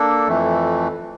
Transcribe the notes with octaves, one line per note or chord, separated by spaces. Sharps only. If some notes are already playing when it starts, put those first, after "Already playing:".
Already playing: A#3 D4 A4
F2 E3 A3